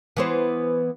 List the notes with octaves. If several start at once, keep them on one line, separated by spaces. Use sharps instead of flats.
E3 B3 C5